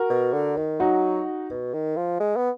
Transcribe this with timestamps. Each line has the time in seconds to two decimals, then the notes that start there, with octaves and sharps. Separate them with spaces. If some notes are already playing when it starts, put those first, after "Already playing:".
Already playing: F#4 A#4
0.10 B2
0.33 D3
0.57 D#3
0.80 F#3 D#4 F#4
1.50 B2
1.74 D#3
1.97 F3
2.20 G#3
2.36 B3